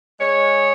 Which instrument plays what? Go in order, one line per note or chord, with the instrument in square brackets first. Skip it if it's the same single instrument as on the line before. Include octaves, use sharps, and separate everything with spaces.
[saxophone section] G#3 C#5